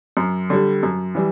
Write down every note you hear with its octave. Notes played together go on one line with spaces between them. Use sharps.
F#2
D3 G3
F#2
E3 G3